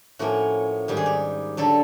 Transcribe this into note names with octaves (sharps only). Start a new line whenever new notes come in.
A2 F3 A#3 C#4 F#4
G#2 D#3 G3 G4
G#4
G4
D3 F#3 A4